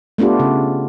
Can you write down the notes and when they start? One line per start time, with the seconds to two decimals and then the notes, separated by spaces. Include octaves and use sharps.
0.18 A3 B3 D4 F4 G4
0.40 C#3